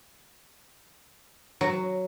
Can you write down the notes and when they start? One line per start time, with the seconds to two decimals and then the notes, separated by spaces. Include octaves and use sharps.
1.61 F#3